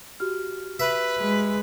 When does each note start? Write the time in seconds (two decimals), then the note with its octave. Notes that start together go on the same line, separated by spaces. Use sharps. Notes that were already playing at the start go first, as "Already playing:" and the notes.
0.20 F#4 G4 F6
0.80 B4 E5
1.19 G#3